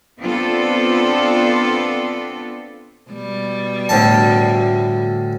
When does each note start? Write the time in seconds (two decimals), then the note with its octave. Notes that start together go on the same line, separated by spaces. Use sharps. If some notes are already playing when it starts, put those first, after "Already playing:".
0.21 B3 C4 D4 F4 A4
3.10 B2 G3
3.89 D2 A2 A5